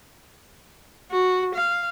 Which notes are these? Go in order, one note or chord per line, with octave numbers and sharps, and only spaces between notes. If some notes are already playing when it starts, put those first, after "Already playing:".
F#4
F5